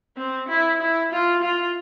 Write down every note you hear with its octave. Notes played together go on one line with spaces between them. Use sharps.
C4
E4
E4
F4
F4